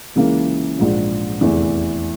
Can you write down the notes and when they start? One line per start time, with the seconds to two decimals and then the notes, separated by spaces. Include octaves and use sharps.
0.16 C#2 C#3 E3 A#3
0.78 A#1 G#2 F3
1.41 F1 E2 E3